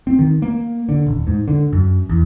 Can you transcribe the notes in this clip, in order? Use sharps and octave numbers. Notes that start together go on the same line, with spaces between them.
C4
D#3
A#3
D3
D#1
G#2
D3
F#2
E2